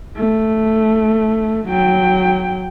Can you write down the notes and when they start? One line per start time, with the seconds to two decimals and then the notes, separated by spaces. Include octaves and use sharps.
0.16 A3
1.68 F#3 G5